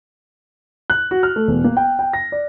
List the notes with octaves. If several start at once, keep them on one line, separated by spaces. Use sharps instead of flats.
F#6
F#4
F6
A3
E1
A#3
G5
G5
A#6
D5